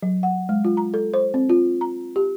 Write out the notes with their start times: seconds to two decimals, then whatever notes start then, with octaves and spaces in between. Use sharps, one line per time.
0.03 F#3
0.23 F#5
0.49 G#3
0.65 F4
0.77 A#5
0.94 A4
1.14 C5
1.34 C4
1.49 F4
1.81 A#5
2.16 G4